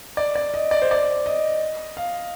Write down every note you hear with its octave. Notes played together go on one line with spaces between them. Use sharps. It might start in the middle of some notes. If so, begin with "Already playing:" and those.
D5
D5
D#5
D5
C5
D5
D#5
F5